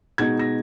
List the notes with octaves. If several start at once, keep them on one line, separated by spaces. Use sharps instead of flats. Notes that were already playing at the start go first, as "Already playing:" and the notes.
B2 G#3 D#4 G#6
A#6